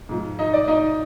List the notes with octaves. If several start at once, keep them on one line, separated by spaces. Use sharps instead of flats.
G#2 F3
D#4 D#5
D5
D#4 D#5